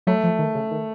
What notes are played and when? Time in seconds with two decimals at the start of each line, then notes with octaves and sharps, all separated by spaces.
0.07 F#3 A3
0.24 F3
0.39 D#3
0.55 C#3
0.71 D#3